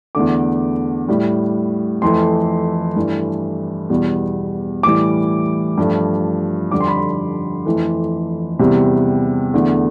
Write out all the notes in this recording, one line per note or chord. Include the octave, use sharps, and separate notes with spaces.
E2 D3 A3 D6
A2 G3
F2 E3 A3 C6
G2 E3 A3
E2 B2 G3
A2 E3 G3 D6
G2 F3 A3
F2 D3 G3 D6
C6
B5
C6
F2 E3 A3
E2 C3 G3
E2 D3 A3